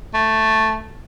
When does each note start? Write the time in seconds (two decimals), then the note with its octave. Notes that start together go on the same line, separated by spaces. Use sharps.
0.14 A3